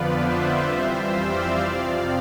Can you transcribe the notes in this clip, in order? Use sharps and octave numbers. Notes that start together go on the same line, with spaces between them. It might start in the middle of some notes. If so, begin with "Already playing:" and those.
Already playing: F2 D3 F3 B3 F4 B4 D5
C5 E5
F2 E3 G3 C4 F4
D5 F5
F2 C3 F3 C4